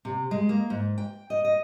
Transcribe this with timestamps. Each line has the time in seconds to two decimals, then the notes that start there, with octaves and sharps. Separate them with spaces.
0.05 C3
0.31 G#3
0.49 A#3
0.70 G#2
0.98 G5
1.30 D#5
1.44 D#5